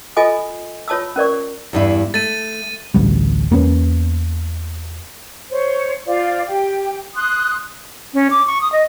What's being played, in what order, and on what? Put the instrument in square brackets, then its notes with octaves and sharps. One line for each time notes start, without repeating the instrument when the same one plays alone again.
[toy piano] F4 A4 D#5 G#5 D#6
F4 C#5 A5 D#6 E6
C#4 A#4 D5 C#6
[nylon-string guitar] E2 G2 E4
[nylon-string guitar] A3 [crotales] A6 D#7
[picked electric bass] A1 D2 G3
E2 A#3 B3 C#4
[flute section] C5 C#5
F4 C5 D5 F5
G4 G5
C6 D#6 F#6
[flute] C#4
D6
C#6
D#6
D#5